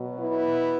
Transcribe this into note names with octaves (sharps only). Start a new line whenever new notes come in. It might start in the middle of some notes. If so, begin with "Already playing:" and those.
Already playing: B2 F#3
B3 E4
B2